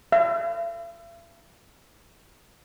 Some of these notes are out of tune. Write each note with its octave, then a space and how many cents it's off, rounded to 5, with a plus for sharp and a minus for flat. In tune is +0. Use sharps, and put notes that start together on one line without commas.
E5 +45